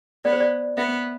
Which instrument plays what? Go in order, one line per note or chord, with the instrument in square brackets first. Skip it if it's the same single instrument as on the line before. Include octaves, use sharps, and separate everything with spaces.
[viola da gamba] B3 [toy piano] D5
[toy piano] C5
D5
[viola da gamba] B3 [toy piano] E5